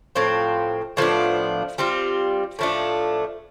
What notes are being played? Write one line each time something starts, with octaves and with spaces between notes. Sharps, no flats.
A2 F3 C4
A2 F3 B3 D4
G3 C4 F4
A2 F3 A3 D4